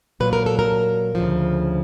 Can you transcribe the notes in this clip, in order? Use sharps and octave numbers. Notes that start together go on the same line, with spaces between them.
A#2 F#3 B4
A#4
A4
A#4
D2 C#3 F3